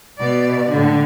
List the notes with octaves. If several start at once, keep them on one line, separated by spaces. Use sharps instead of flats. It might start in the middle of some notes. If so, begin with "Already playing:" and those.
B2 D5
A2 D3